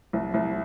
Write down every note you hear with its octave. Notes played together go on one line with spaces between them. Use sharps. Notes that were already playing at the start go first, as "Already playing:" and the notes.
C2
C2